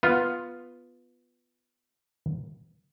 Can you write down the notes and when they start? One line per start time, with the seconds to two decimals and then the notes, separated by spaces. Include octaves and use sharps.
0.03 B3 F4